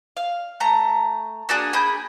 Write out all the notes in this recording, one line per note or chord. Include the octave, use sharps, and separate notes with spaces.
F5
A3 A#5
A#3 D4 F#4 G#4
A#3 G#4 B5 G6